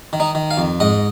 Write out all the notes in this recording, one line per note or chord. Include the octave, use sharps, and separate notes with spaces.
D#3
D#4
D#3
F5
F2
G#2 D#5